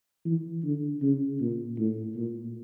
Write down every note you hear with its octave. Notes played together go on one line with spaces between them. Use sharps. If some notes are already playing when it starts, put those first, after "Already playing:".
E3
D3
C#3
A#2
A2
A#2